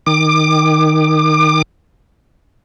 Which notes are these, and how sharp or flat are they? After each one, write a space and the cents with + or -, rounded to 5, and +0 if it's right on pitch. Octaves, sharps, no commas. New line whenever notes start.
D#3 +0 D6 +30